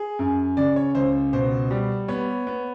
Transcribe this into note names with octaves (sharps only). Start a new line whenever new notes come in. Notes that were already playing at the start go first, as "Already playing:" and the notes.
Already playing: G#4
F#2
C#3 D5
C#5
C#2 C5
B2 C5
G3
B3 C#5
B3